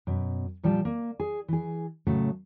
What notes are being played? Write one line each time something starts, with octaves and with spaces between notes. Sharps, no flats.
F#2 B2
A#2 F3 G3 F4 A5
A#3
G#4
E3 G#4
A2 C#3 F#3 A3